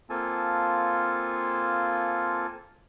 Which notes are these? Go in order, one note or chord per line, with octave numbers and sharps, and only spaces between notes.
A#3 C4 F4 A4 G#5 A5